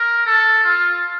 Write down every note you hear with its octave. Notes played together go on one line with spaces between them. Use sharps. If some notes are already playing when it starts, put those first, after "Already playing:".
Already playing: A#4
A4
F4